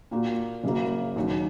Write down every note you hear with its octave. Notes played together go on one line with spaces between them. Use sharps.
A#2 A#3 F#4
F#1 F#2 C#3 F#3 A#3
D#2 D#3 F#3 C#4